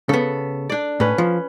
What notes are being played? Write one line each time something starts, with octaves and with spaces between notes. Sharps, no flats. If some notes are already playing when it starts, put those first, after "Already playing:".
C#3 B3 A4
D4 D5
A2 C#4 B4
F3